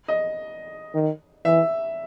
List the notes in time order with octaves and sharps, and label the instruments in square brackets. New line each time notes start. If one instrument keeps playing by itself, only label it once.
[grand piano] D#5
[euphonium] D#3
[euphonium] E3 [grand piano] E5